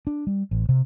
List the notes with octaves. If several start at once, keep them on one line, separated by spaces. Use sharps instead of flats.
D4
G3
A1
C3